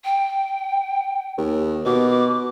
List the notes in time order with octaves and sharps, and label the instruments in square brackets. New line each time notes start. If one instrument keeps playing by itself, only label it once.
[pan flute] G5
[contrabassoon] D#2
[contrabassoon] B2 [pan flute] D6